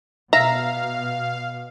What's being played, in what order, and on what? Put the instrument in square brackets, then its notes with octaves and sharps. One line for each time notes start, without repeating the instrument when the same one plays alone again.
[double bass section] B2 [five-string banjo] E5 [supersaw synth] F5 [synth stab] A#5